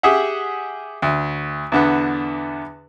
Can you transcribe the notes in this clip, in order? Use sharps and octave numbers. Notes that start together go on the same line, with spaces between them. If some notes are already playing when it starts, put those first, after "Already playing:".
G4 G#4 E5 F#5
D2
E2 D3 B3